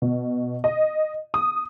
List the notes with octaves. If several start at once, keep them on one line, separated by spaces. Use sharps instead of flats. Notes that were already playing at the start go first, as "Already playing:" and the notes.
B2
D#5
D#6